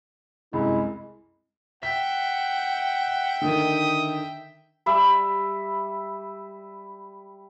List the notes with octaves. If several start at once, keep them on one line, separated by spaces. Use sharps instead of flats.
C2 F#2 G#3 E4
E5 F#5 G5 B6
D3 D#3 D#6
G3 E5 B5